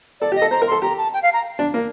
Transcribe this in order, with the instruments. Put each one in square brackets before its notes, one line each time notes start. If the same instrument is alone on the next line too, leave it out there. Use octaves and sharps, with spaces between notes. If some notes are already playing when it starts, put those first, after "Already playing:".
[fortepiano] A4 [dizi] D5
[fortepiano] G4
[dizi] D#5
[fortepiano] A4
[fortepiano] C5 [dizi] A#5
[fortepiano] A#4
[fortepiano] A4 [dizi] C6
[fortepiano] G4 [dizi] A#5
[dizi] A5
G5
F5
A#5
[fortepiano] D4
A#3